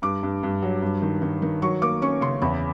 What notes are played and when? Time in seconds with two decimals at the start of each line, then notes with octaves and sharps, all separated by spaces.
0.02 G2 D6
0.23 G2
0.43 G2
0.62 F#3
0.82 G2
1.02 D#3
1.22 D#3
1.42 D#3
1.62 F#3 C#6
1.82 A#3 D6
2.02 C#4 C#6
2.21 C#3 C6
2.42 E2 B5